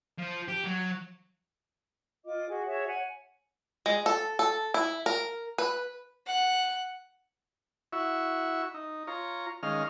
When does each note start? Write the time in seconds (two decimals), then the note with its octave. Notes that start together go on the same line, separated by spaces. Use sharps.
0.18 F3
0.48 G4
0.64 F#3
2.25 F4 D#5 D6
2.48 F#4 G#4
2.66 F#4 G#4 C#5 E5
2.88 C#5 F#5 G#5
3.86 G#3
4.06 A4
4.39 A4
4.74 E4
5.06 A#4
5.58 B4
6.27 F#5
7.93 E4 F#4 E5 C#6
8.74 D#4
9.07 F4 C#5 A#5
9.63 D#3 G#3 C#4 D#5 F5 F6